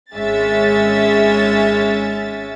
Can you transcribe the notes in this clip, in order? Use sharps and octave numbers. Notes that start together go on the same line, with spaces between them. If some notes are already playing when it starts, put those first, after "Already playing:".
G#1 G#3 C#4 E5 A6